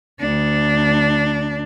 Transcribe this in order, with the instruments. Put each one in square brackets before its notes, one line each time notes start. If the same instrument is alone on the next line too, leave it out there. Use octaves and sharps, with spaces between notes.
[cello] D2 D4